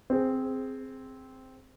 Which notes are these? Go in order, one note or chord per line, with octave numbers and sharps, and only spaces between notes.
C4 G#4